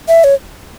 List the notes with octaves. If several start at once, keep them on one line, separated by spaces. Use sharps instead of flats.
E5
C#5